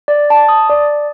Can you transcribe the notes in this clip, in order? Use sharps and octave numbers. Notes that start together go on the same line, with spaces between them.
D5
A5
D#6
D5